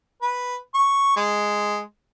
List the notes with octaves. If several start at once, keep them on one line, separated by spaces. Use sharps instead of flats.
B4
C#6
G#3